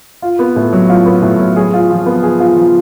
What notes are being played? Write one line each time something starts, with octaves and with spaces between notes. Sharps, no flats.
F4
B3
A2
F#3
F4
B3
A2
F#3
G#4
F4
F3
B3
G#4
F4
F3